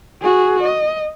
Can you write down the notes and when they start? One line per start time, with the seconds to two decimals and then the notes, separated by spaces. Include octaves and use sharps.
0.21 F#4 G#4
0.63 D#5